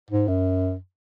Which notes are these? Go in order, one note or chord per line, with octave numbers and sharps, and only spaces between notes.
G#2
F#2